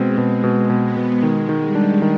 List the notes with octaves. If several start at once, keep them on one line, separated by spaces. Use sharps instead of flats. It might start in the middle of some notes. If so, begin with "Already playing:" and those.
Already playing: B2 G#3 C4
B2
B2 G#3
B2
B3
B2
D#3 G#3
D#3
G3
D4
D#3